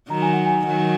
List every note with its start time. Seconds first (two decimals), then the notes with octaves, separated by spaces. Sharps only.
0.10 D#3 F#3 A#5
0.22 G#5
0.33 F#5
0.46 G#5
0.66 D#3 F#3